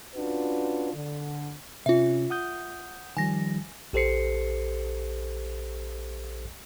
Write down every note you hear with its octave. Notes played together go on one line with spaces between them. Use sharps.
C#4 D4 F4 F#4 B4
D3
C3 C#4 F4 E5
F#5 D#6 G6
D#3 F3 G3 G#5 A#6
A#1 G4 A4 C5 C7 C#7